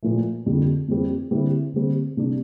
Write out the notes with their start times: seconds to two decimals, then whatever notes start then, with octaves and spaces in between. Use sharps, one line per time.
0.03 A#2 F3 A3
0.46 F2 D3 G3
0.88 F2 E3 G3 C4
1.31 D3 G3 C4 E4
1.73 D3 G3 C4
2.17 C3 G3 D4